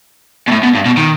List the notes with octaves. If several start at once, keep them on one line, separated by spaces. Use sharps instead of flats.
B2
A2
B2
G2
B2
D#3